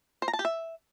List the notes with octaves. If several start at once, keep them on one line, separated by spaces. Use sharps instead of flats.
C5
A#5
A5
G4
E5